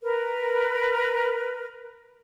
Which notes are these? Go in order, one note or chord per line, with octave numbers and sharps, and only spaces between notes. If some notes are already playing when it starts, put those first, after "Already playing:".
A#4 B4